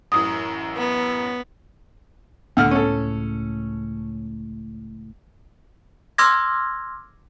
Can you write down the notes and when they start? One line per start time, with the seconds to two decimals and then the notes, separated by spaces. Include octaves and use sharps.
0.12 A1 F#2 E3 D#6
0.76 B3
2.57 C#2 A2 D3 F#5 F6
2.71 C#4 A4
6.18 C6 D6 E6 F6 G#6 A#6